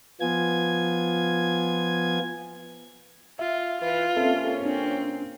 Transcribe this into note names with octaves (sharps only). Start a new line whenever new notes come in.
F3 B3 F4 G#5 G#6
F4 E5
E3 F4 B4
C3 A#3 C4 C#4 A4 E5
C4 D4